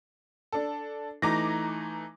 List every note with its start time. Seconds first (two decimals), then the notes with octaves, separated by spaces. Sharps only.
0.52 D4 A4
1.22 E3 A3 D#4 A#5 D6 A#6